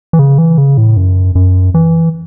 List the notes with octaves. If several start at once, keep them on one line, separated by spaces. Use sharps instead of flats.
E3
C#3
E3
C#3
A2
F#2
F#2
E3